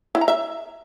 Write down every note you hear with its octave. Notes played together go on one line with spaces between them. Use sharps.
E4
A#5
E5